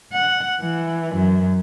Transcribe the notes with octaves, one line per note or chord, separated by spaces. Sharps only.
F#5
E3
F#2